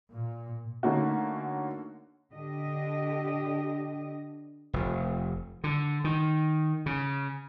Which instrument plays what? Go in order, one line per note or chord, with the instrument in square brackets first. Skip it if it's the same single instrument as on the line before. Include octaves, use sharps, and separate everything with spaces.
[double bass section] A#2
[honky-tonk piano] D3 A3 A#3 C#4 D#4 F#4
[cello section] D3 D4 G4 D#5
[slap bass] F1
D3
D#3
C#3